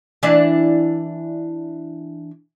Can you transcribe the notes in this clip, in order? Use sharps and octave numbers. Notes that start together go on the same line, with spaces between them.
E3 D4 E5